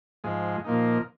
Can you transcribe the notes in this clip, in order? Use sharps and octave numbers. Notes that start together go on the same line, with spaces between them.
G#2 F3 G#3
A#2 F3 A#3 D#4